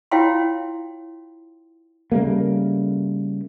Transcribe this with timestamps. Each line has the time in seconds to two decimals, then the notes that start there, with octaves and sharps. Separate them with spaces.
0.11 E4 F4 C#5 F5 G5 C6
2.12 C#3 G3 A3 A#3